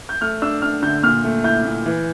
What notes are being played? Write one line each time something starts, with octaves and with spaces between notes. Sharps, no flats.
G6
A3 F6
D4 E6
D4 F6
D3 G6
A#2 F6
A3
E4 G6
A#2
E3